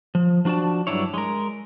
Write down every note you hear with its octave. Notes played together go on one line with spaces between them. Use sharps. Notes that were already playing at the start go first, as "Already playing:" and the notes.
F3
F3 D4 F#4 D5 A5
G2 B2 F#3 D4 E4 C#5
G#3 A#4